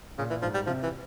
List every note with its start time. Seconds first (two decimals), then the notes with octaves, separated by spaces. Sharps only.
0.18 A#2 C#3
0.30 E3
0.42 G#2 F3
0.54 G3
0.67 C3 F3
0.83 E3